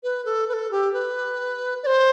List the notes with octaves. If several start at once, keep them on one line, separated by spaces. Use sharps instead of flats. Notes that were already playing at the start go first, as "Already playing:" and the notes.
B4
A4
B4
A4
G4
B4
D5
C5